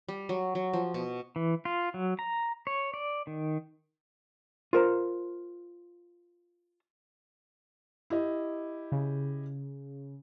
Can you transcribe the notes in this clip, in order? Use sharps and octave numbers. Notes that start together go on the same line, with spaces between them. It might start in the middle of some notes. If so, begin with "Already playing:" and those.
G3
F#3
F#3
F3
B2
E3
F4
F#3
A#5
C#5
D5
D#3
F4 A#4 C5 A#5
E4 G4 D#5
C#3